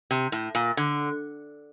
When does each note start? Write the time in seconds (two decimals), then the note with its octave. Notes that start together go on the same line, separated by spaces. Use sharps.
0.11 C3
0.32 A2
0.55 A#2
0.77 D3